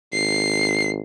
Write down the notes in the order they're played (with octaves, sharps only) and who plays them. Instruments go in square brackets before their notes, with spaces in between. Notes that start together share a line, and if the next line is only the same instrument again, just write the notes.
[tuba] G#1 [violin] C7